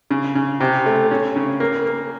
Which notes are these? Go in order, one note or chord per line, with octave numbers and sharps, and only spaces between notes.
C#3
C#3
C3
A3
C#4
C#3
A#3
A#3